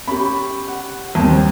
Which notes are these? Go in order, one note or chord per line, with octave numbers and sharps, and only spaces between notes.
C#4 G4 B5
F#5
D#2 G3 C4